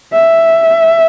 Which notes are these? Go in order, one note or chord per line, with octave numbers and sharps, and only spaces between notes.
E5